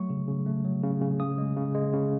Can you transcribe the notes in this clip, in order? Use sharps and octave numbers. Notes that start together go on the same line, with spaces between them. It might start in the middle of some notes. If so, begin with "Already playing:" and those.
Already playing: F#3 A3 C#6
C#3
C#3
A3
F#3
C#3
C#3
C#3 D#6
G#3
C#3
G#3
C#3